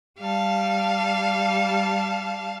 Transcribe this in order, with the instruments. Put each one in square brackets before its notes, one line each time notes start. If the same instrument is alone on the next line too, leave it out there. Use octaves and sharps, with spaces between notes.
[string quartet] G3 F5 A5